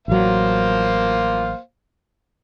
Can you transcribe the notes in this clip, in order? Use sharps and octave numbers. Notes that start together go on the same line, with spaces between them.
A1 F#3 A#3 C5 F5